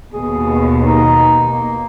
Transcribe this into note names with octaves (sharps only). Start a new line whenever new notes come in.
D#2 B2 G#4
D#4
A#3